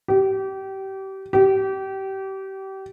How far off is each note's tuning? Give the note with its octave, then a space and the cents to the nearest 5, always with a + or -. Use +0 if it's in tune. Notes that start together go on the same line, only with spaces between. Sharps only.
G4 -30
G4 -30